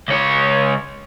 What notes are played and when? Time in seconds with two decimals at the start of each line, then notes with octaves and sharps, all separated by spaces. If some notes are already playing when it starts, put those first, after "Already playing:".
0.08 C#2 C#5